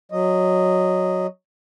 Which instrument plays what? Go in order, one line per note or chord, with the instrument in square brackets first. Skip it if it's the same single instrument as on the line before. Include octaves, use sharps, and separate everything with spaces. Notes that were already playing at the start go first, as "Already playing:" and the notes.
[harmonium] F#3 D#5